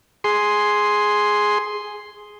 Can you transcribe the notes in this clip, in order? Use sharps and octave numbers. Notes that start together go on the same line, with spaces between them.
G#4 C6